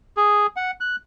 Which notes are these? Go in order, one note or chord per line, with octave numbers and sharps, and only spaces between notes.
G#4
F#5
F#6